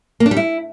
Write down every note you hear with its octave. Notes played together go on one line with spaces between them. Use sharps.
A#3
D4
G3
E4